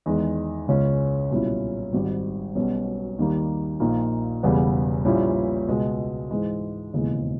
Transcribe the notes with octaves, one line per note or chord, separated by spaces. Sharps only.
E2 D#3 G#3
C#2 C#3 G#3 C#4
B1 A#2 G3 C#4 E4
G#1 G#2 G3
B1 B2 G3 C#4
D#2 D#3 G3 A#3
A#1 A#2 A#3 D#4
E1 E2 C#3 G3 B3
A#1 A#2 G3 C#4 E4
C#2 B2 G#3
G#2 E3 G#3
E1 D#2 C#3 E3 G#3